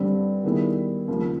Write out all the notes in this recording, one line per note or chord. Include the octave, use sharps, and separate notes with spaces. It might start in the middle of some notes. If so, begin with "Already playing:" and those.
Already playing: G2 D3 G3 C4
D#3 G3 B3 E4 G#4
D#2 C#3 F3